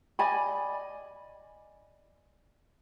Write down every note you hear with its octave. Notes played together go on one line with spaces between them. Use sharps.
D5 D#5 G#5 B5